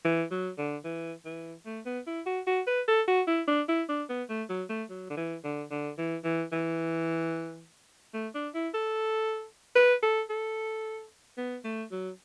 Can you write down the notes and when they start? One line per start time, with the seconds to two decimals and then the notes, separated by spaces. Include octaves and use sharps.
0.05 E3
0.31 F#3
0.58 D3
0.84 E3
1.26 E3
1.66 A3
1.86 B3
2.07 E4
2.26 F#4
2.47 F#4
2.67 B4
2.88 A4
3.08 F#4
3.27 E4
3.48 D4
3.69 E4
3.89 D4
4.09 B3
4.29 A3
4.49 F#3
4.69 A3
4.90 F#3
5.10 D3
5.17 E3
5.44 D3
5.71 D3
5.98 E3
6.24 E3
6.52 E3
8.14 A3
8.35 D4
8.54 E4
8.74 A4
9.76 B4
10.03 A4
10.30 A4
11.38 B3
11.65 A3
11.91 F#3